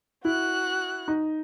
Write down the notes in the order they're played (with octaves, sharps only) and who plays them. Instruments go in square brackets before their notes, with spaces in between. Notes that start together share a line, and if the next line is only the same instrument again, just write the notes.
[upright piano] E4 [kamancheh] F#4 F#6
[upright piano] D#4